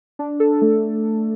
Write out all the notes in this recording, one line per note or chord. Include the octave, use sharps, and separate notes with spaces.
D4
A4
A3